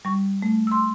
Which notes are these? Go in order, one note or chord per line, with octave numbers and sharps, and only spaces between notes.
G3 C#6
A3
C6 E6